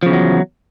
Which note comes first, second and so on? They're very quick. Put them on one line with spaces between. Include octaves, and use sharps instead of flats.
F3 C#3 E2 F#3